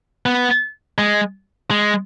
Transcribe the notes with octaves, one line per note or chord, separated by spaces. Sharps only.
B3
G#3
G#3